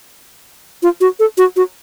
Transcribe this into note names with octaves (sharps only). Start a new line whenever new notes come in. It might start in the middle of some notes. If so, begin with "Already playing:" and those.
F4
F#4
A4
F#4
F#4